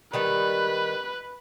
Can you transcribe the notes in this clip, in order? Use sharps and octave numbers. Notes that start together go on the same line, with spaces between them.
D#3 G3 D#4 B4